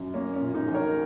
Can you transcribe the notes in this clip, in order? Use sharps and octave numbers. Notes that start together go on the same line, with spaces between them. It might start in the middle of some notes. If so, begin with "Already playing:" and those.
Already playing: F#2
A#3 C#4
C#4
A#2
D#4
A#1
A#4 C#5